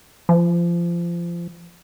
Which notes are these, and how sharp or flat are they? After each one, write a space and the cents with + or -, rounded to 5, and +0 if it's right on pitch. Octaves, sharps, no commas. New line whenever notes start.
F3 -25